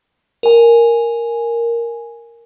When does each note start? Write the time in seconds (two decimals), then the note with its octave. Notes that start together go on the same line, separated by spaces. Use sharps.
0.43 A#4 G#5